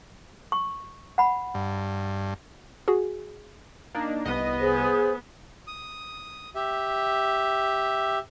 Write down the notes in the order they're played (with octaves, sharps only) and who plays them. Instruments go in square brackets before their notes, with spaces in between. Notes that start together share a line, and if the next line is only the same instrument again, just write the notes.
[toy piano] C#6
F#5 B5
[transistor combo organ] G2
[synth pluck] F#4 G#4
[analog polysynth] A#3 D4 D#4
[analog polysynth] C2 D#5 [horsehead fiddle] B3
[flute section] G#4 C5
[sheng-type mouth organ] D#6
G4 E5